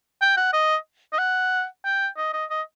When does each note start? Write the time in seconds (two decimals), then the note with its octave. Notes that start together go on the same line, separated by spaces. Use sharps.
0.21 G5
0.37 F#5
0.53 D#5
1.13 D#5
1.18 F#5
1.85 G5
2.17 D#5
2.33 D#5
2.50 D#5